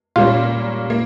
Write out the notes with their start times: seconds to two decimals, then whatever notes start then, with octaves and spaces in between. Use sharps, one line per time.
0.16 A#2 G3 A#3 C#4 F4
0.90 A#3